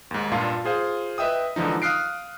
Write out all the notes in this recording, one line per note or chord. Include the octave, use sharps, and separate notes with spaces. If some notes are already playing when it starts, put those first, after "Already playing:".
D#2 G#2
G2 A#2 F4 F5 A5
F4 G#4 C5 F5
B4 D#5 E5 G5 D#6
G#2 D3 E3 F3 D#4
F5 D#6 F6 F#6 C7 D7